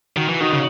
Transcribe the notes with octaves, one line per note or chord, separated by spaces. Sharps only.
D#3 F#4
E3
D#3 D#4 F#4
C#3